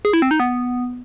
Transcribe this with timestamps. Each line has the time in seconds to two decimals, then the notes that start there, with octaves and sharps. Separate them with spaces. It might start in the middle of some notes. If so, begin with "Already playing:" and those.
0.05 G#4
0.13 E4
0.22 C4
0.31 D#4
0.40 B3